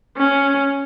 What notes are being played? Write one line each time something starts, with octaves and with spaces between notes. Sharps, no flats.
C#4